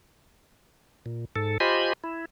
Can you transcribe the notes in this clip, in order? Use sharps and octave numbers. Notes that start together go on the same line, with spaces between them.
A#2
G#2 A4
F4 G4 C5 D#5 G#5 B5
E4